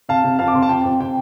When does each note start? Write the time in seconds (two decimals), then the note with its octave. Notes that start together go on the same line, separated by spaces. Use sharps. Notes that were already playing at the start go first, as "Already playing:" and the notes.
0.09 C3 F5 A5
0.24 C3
0.39 F2 F5 A5
0.48 D6
0.54 C3 C6
0.62 A5
0.69 F2 G5
0.85 F2
1.00 C3 G5